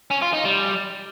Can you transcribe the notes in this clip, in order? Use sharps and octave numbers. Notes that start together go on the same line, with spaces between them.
C#4
F4
D#4
G3